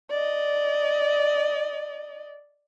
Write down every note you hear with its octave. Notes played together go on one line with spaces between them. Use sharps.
D5 D#5